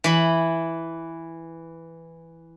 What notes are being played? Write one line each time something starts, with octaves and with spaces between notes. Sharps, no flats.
E3 B5